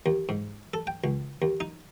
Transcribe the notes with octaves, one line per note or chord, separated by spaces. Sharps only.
D#2
G#2
A4
G5
C#2
D#2
D#4